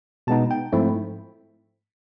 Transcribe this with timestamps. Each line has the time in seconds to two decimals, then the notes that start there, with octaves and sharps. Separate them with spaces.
0.27 B2 G#3 B3 D#4 A5
0.51 G5
0.73 G#2 F3 A3 C4 E4